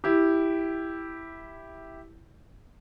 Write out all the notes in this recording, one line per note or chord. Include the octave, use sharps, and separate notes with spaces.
E4 G4